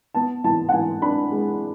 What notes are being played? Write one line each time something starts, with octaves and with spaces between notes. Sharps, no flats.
B3 A5
E3 A5
F#5
E3 G#5
D4 B5
G#3